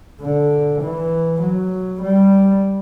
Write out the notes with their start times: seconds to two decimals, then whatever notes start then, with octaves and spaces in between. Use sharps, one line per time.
0.22 D3
0.82 E3
1.42 F#3
2.02 G3